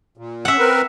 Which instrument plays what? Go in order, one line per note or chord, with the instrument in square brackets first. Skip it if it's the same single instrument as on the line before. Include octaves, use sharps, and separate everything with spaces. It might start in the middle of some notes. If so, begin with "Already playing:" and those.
[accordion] A#2
[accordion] C#4 [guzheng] E5 F#5
[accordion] C4 A#4 B4